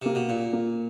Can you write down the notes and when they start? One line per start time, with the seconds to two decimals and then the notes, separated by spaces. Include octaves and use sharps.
0.02 C3 A#3
0.15 B2
0.29 A#2 F4
0.53 A#3